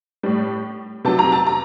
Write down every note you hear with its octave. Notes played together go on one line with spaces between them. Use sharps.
A2 G3
C3 F#3 A5
A#5
A5
A#5